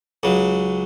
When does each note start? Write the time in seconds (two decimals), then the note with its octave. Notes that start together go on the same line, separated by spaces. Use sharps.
0.23 C#2 C#3 F#3